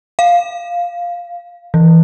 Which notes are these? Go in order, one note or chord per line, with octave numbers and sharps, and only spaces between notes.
F5
E3